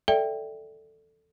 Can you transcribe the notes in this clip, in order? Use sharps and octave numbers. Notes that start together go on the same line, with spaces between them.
A4 D5 E5 G5